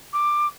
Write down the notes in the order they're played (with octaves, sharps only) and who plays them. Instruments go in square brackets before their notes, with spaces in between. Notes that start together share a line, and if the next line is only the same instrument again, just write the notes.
[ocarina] D6